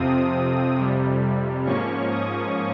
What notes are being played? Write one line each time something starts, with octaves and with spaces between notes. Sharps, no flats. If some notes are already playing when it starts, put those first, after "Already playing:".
Already playing: F2 C3 F3 C4 D#6
F2 C3 G3
G#2 F3 A#3 C#4 C#6
D#6